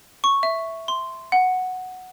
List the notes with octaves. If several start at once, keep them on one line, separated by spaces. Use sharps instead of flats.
C#6
E5
C6
F#5